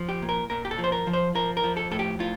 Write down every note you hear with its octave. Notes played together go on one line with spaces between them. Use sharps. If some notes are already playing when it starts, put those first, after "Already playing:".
Already playing: F3
G4
A#2
A#4
A#2 A#4
G4
A4
F3
C5
A#4
F3
C5
F3 A#4
A#4
F3
A4
A2 A4
G4
A2 F4